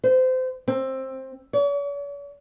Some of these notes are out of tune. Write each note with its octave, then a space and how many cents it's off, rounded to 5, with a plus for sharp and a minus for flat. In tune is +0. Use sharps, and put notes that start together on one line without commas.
C5 -25
C4 +15
C#5 +45